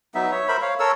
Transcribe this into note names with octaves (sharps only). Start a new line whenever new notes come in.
F#3 B3 D#4 E5
C#5 E5
A#4 C5 E5 B5
C#5 F5
A4 A#4 C#5 E6